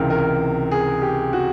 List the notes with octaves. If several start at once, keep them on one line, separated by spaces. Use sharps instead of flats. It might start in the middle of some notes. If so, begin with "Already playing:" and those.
Already playing: C#2 C3 E3 A#4
A#4
G#4
G4
F#4